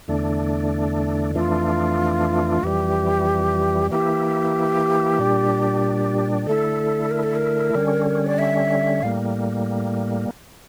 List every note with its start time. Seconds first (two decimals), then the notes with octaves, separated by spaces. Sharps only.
0.08 E2 D3 A3 D4
1.35 F2 E3 A3 D4 F4
2.63 F2 E3 G3 G4
3.91 E3 A#3 E4 G4
5.19 A#2 G3 D4
6.47 D3 A3 E4 A4
7.11 A#4
7.23 A4
7.36 A#4
7.75 D3 G3 C#4
8.26 D5
8.38 E5
9.03 A2 G3 A#3 F5